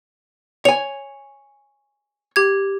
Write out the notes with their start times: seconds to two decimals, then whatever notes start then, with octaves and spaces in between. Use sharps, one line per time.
0.65 C#5 G#5 F7
2.36 G4 G#6